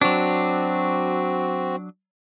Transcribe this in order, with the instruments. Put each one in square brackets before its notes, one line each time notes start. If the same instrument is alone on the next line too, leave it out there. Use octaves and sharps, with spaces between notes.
[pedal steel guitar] F#3 D4 [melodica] C4 F#4